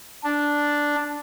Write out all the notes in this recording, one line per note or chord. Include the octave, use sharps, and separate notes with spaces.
D4